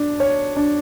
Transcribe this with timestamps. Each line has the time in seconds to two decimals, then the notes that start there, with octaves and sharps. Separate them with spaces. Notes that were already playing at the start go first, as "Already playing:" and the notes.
Already playing: D4
0.20 C#5
0.56 D4